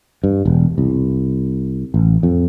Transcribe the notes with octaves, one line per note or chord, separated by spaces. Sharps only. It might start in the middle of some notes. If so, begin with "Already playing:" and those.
G2
E1
C2
A1
F2